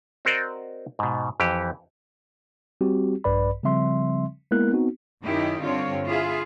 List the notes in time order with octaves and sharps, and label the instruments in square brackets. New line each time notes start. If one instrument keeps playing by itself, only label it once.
[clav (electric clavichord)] C4 F#4 A#4 C5 D5 D#5
G#2 B2
F2 E3 G4
[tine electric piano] G3 C4 F#4 G4
A#1 G2 B4 D5 B5
C#3 F3 G3 C4 E5 C6
G#3 A#3 B3 E4 A#4 F#6
B3 C4 D#4 F#4
[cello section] F#2 D#3 C#4 D#4 E4 G4
G2 D3 C4 F4 C#5
E4 F4 G#4 E5 F5